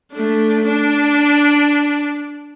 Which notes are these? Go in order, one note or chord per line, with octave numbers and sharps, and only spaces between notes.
A3 D4
D4